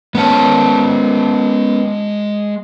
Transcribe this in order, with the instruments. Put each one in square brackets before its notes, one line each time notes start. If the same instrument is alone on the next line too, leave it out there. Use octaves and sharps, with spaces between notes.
[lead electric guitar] G#3 A5 [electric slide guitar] B3 C#4 C#5